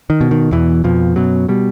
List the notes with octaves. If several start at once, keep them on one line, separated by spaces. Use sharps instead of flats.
D#3
B2
D#3
E2 B2 E3
F2 B2 F3
F#2 B2 F#3
B2 G3